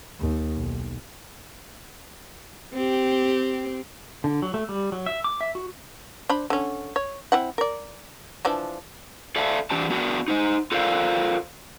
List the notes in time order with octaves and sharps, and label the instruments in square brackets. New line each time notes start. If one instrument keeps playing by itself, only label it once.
[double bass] D#2
B1
[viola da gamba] C4 G4
[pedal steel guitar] D3
F#3
A3
G3
F#3
E5
D6
E5
F#4
[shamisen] D4 C5 B5
D3 C#4
C#5
C4 E4 F#5
A#4 D5
E3 F3 D4
[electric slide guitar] A4 D5 E5 F5 A5
E3 D4 G4 D5 A5
B3 D4 F#4 A#4
D#4 C5 D#5
F4 A4 A#4 C5 D5 F5